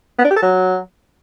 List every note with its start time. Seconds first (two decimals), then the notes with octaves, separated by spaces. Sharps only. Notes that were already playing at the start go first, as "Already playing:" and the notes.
0.19 B3
0.25 D4
0.31 G4
0.37 A4
0.42 F#3